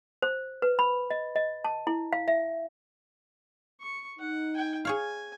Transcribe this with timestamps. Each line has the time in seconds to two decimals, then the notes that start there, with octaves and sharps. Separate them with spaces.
0.22 C5
0.62 B4
0.79 B5
1.10 D#5
1.36 D#5
1.64 A5
1.87 E4
2.13 F5
2.28 E5
3.81 C#6
4.19 D#4 F#5
4.55 G5 G#5
4.85 G#4 C#5 F5 G#5